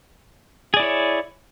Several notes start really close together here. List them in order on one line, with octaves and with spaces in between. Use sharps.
G#4 D5 E4 C#5